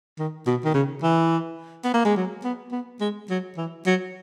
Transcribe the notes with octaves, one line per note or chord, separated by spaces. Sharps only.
D#3
B2
D#3
C#3
E3
B3
A#3
G#3
F#3
B3
B3
G#3
F#3
E3
F#3